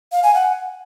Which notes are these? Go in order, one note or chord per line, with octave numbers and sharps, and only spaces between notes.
F5
G#5
F#5